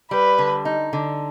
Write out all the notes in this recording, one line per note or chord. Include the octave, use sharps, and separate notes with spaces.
G3 B4
D3
D#4
D3